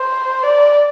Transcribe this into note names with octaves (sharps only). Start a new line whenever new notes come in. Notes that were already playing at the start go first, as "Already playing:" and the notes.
Already playing: C5
D5